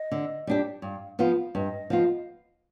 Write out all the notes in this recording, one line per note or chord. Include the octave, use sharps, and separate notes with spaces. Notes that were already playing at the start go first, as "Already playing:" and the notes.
Already playing: D#5
D3
G3 D4 G4
G2 F5
F3 B3 F4 F5
G2 D#5
F3 B3 F4